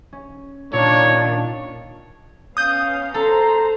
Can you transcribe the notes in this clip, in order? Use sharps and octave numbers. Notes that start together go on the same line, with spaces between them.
C#4
A#2 D#3 D4 C#5
B3 C#4 F5 D#6 G6
A4 C5 A#5